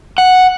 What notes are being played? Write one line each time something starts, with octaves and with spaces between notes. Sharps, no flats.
F#5